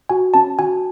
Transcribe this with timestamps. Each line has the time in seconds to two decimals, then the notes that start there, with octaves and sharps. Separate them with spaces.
0.09 F#4 G#5
0.34 C#4 A5
0.59 F#4 G#5